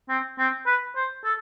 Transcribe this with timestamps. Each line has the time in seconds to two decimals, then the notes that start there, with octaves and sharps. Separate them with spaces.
0.09 C4
0.39 C4
0.66 B4
0.96 C5
1.25 A4